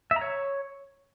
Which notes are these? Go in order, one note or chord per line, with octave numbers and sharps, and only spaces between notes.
E5
A#5
C#5